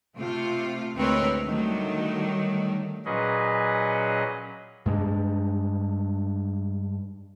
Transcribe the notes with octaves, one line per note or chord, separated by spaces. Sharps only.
C3 A3 F4
D2 G#3 C4 A#4 B4 C#5
D3 D#3 F#3 G3 A3
A#2 F#3 C#4 G#4 B4 D#5
G2 G#3 A#3 D4